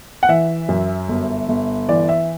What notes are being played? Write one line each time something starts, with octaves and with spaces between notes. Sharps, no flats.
F#5
E3 E5
F#2
G1
G1
E3 D5
E5